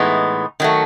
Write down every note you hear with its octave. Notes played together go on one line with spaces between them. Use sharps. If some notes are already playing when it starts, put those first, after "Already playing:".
Already playing: A2 E3 G#3 B3 D#4
D#3 F#3 A3